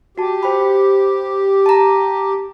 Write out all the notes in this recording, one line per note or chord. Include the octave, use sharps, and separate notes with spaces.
F#4 G4 A5
C5 G5 B5
A5 A#5